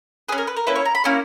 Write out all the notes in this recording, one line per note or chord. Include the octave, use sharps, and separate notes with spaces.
C#4 G#4 B4
A#4
B4
A#4
A#3 C#4 E4 B4
C#5
A#5
B5
A#3 C#4 E4 C#6